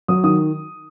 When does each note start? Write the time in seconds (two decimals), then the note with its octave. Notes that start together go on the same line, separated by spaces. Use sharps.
0.08 F#3 D#6
0.24 D#3 D#6